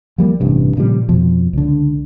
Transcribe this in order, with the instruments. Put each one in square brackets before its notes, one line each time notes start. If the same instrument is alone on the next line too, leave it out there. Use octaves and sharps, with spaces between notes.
[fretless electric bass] F3 G3 A#3
A1 G2 C3
A#2 C#3 F3 G3
F2 B2 F3
C#2 D3